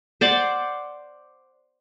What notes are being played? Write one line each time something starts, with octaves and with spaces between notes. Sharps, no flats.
C5 D5 F#5 D6